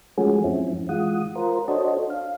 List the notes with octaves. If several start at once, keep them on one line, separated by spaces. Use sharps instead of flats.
F3 G#3 A3 C#4 F#4 G#4
F#2 F3 C4 C#4 E4
E3 G#3 F4 F#5 D#6
F4 A#4 C5
D4 F#4 A4 C5 C#5 D#5
F5